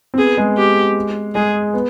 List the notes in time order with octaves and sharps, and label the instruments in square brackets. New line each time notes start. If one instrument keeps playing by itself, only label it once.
[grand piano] C4
[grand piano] B3 [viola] G#4
[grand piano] G#3
[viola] G4
[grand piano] G#3 [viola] G#4
[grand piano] B3